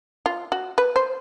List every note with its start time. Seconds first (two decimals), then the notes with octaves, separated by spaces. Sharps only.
0.26 F4
0.52 F#4
0.78 B4
0.96 C5